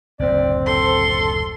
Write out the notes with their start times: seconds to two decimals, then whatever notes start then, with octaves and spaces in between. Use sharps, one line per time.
0.19 F#1 D2 A2 C4 D5
0.67 A4 C6